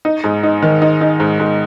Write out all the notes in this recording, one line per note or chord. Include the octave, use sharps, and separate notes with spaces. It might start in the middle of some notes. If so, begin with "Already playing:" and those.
D#4
G#2
D#4
D#3
D#4
D#4
G#2
G#2